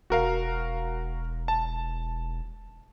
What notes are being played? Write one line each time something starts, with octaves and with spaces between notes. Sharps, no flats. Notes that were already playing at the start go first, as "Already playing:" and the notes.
E1 F#4 A#4 F5
A5